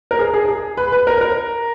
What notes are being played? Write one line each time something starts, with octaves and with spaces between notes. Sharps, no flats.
A#4
G#4
G#4
G#4
B4
B4
A#4
A#4